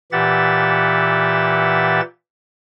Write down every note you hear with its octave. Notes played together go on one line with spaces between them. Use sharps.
A#2 E3 G4 E5 F#5 A6